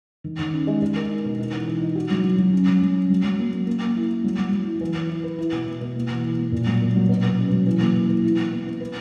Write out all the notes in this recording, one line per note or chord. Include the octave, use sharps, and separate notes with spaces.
D#3
D#3
C#4
G#3
G#3
A#4
D#4
B2
D#4
E3
E3
D#4
F#4
F#3
F#3
F#3
C#4
F#3
F#3
C#4
F#3
F#3
A#3
A#3
A#3
A#3
E4
E4
F#3
F#3
F#3
E4
E3
E3
E4
B4
E4
B2
B2
B2
A#3
E3
E3
A#3
A#2
F#3
A#3
F#3
B2
B2
C#4
F#3
E3
A#3
E3
E3
E4
E4
B3
B3
B4